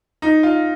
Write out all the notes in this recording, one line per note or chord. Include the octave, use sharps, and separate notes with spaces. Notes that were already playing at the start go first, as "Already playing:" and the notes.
D#4
F4